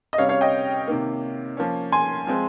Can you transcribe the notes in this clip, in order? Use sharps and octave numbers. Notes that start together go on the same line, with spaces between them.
D#5
C3 G3 C#4 C#5 F5
C#5 F5
D#5 G5
C3 D#3 A#3
F3 A#3 C#4
G#5 C6
F3 G#3 C4